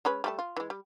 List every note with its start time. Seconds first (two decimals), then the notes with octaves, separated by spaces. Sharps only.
0.05 G#3 C#4 B4
0.24 G3 A3 A5
0.39 F4
0.57 E3 G#3
0.70 G3